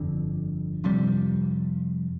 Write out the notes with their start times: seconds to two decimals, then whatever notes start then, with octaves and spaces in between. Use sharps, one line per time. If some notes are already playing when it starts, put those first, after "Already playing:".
Already playing: G1 F2 D3
0.84 F2 C3 G3